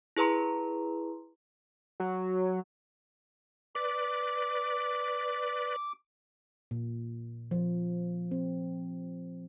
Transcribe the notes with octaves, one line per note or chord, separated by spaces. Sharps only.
E4 G#4 B4 A#5 C6
F#3
B4 D5 D6
A#2
F3
C4